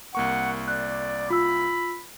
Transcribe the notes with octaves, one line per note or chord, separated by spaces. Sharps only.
C2 A#3 F#5 C#6
D5 F#6
F4 B5 E6